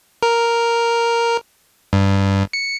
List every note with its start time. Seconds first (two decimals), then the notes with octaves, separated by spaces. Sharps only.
0.23 A#4
1.93 G2
2.53 C#7